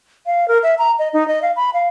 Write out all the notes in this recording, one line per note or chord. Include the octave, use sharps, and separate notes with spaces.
F5
A#4
E5
A#5
D#5
D#4
D#5
F5
B5
F5